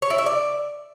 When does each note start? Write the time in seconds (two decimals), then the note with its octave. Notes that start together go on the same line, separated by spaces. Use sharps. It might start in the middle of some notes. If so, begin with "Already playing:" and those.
0.02 C#5
0.10 E4
0.18 E5
0.26 D5